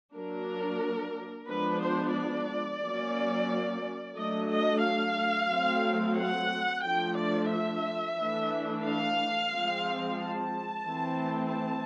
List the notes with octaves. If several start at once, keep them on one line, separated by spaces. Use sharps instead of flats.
F#3 A#3 D4 A#4
F3 G#3 B3 D4 B4
C5
D5
F#3 A#3 C#4
F#3 A3 D4 D#5
D#5
F5
F#3 A3 C4
F#5
F3 A3 D4 G5
D5
E5
E3 A3 D4
F5
F3 G#3 C4
A5
E3 A3 C4
A5